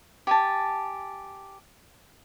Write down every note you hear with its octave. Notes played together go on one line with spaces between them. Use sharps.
G4 G#5 A5